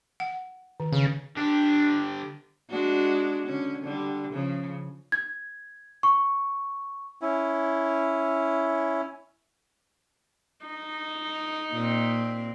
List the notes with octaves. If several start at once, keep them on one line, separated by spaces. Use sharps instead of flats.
F#5
D#3
C#3
D3 D4 G4
G#3 D4 F#4
D3 C#4
D3 G3
C#3 F3
G#6
C#6
C#4 E4
D#4
A#2 C4